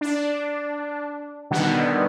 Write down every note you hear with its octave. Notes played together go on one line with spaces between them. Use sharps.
D4
B2 D3 D#3 G3 B3